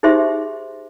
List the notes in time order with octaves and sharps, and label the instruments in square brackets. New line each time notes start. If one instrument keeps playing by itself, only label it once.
[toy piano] D#4 G4 G#4 C5 E5 C6